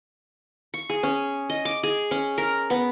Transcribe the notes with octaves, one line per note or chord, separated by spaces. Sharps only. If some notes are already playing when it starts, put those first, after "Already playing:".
C#6
G#4
C#4
D#5
D6
G#4
C#4
A#4
B3